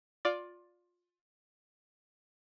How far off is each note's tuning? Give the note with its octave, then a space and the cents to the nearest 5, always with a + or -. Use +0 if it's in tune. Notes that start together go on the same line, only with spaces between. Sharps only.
F4 +20 D5 +0